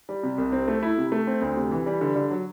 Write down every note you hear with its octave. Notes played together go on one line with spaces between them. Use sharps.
G3
C3
C2
C4
A3
E4
C3
A3
C4
D2
C3
E3
G3
D3
D3
F#3